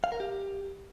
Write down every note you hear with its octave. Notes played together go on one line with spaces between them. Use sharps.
F5
A#4
G4